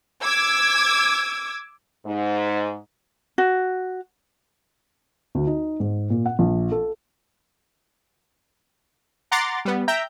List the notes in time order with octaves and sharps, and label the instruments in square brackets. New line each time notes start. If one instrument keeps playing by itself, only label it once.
[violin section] D6 E6 G#6
[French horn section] G#2
[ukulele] F#4
[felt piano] D2
D#4
G#2
A#2
F#5
A#1
A4
[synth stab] F#5 A#5 C6 D6 A6
G3 B3
E5 G5 A#5 G6